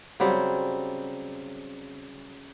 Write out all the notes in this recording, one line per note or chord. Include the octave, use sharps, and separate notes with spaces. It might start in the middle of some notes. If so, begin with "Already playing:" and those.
C#3 F#3 G3 C4